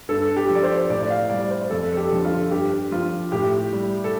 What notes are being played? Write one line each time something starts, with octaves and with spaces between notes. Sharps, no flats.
G2 A4
G4
F3
D5
C5
A2 D5
D5
F5
G3 D5
C5
F2 A4
A4
G4
D3 F3
F4
G2 G4
F3 F4
A2 G4
G3
A4